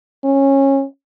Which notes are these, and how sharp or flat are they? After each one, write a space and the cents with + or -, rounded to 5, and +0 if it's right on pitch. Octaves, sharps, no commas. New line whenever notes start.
C#4 -20